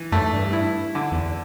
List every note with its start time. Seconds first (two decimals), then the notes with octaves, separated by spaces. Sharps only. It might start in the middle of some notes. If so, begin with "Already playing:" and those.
Already playing: E3
0.12 F#2 A3
0.33 G2
0.53 E4
0.95 D3
1.12 E2